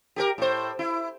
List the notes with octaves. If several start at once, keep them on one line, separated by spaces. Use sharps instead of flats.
G4 G#4 A#4
A2 C5
E4